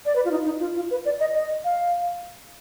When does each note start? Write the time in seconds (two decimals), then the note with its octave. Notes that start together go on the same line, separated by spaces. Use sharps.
0.06 D5
0.16 B4
0.25 F4
0.31 D#4
0.45 D#4
0.60 F4
0.75 F4
0.91 B4
1.05 D5
1.20 D#5
1.35 D#5
1.64 F5